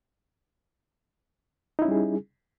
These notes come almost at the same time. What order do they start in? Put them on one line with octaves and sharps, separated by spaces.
D#4 E4 C#4 G3 G#4